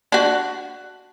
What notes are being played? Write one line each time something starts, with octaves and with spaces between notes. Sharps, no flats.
D4 F#4